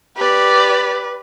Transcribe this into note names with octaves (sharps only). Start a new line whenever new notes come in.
G4 B4 D5